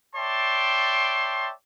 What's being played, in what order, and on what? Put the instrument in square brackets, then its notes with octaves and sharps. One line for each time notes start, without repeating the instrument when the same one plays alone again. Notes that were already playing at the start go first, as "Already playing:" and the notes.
[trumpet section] C#5 D5 E5 G5 A5 C6